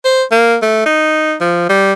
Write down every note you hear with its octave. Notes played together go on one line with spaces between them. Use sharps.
C5
A#3
A3
D#4
F3
G3